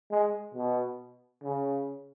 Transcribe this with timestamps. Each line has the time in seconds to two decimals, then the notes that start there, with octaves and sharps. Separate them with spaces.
0.11 G#3
0.54 B2
1.43 C#3